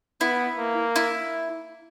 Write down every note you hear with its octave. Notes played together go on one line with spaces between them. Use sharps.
B3 E4
A#3
E4